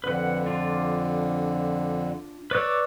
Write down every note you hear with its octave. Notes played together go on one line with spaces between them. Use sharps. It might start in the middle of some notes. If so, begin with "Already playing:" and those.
F2 D3 B4 F#5
D4 F4
B4 C#5 D5 E6